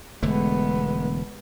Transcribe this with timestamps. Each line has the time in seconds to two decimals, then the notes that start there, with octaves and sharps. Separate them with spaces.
0.23 E1 D3 G#3 A3 B3